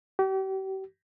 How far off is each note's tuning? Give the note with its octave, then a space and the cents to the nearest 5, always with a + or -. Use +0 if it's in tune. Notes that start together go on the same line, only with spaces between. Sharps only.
G4 -40